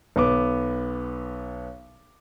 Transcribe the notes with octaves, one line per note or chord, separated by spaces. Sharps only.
B1 B3 D6